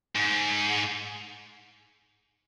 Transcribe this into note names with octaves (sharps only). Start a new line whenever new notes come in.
G#2